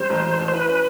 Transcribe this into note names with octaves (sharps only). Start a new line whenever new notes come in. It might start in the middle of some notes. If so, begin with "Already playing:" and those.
Already playing: G3 C4 C5
A1
A1
A1
C5
E3 B4
C#4